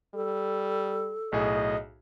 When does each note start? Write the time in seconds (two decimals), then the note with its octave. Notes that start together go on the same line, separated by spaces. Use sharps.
0.14 G3 A4
1.32 B1 A2 G#4 D#5